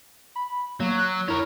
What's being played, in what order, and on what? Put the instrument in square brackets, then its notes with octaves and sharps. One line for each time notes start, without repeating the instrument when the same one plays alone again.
[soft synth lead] B5
[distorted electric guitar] F#3 [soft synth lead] A#3
[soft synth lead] F#6
[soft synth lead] E4 [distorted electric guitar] A#4 C#5